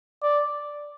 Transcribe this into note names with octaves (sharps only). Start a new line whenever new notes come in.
D5